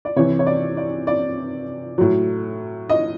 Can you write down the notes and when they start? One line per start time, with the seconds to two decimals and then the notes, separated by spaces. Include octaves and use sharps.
0.05 D5
0.16 C3 E3 C#5
0.39 C#5
0.46 D5
0.77 D5
1.07 D5
1.98 A2 F#3
2.89 D#5